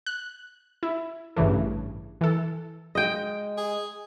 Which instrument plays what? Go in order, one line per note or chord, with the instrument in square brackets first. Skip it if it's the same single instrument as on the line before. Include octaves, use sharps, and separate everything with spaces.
[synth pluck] F#6
E4
A1 G2 C#3 E3 A3
E3 A4
[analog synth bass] G#3 [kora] D#5 G5
[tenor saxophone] G#4